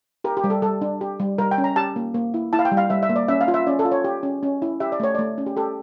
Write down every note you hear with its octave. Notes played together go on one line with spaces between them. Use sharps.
G4 A#4
G4
G3
A4
G3 A4
D4
G4
G3
G3 A#4
G5
C#4
A#5
G4 A5
A#3
A#3
E4
E4 A5
F5
G5
G3
F5
G3 E5
E5
A#3
D5
C#4 E5
F5
F4
E5
C#4 D5
A4
F4
C#5
G4
C#4
C#4
E4
G4 E5
D5
A3 C#5
A3 D5
C#4
G4
G4 A4